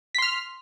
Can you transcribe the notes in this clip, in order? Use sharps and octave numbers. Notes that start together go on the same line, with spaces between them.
C6 F6 B6